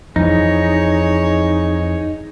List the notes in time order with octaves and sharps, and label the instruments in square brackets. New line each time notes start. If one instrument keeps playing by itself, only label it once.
[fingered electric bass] F2 E3 [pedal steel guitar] D#4 [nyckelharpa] G#4 C#5